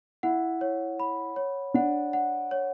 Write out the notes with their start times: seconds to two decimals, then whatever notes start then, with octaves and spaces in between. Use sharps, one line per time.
0.23 E4 F#5
0.61 C#5
1.00 B5
1.36 C#5
1.74 D4 F#5
2.13 F#5
2.51 C#5